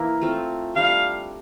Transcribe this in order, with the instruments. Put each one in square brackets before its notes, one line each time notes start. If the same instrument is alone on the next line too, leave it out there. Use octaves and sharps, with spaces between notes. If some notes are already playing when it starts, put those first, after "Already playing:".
Already playing: [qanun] E3 A#3 E4 A#4
A3 C4 F4
[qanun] G3 D4 G4 [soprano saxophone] F5